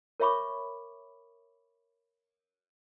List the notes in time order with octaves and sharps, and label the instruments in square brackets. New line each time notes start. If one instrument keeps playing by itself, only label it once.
[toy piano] A#4 C#5 E5 B5 C#6 D6